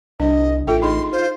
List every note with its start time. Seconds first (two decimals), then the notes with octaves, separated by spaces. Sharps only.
0.20 C2 D4 D#5
0.67 A1 F4 A4 E5 G5
0.82 D#4 G#4 D#5 C6
1.12 F4 C5